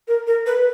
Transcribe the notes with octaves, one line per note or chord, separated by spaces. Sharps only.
A#4
A#4
B4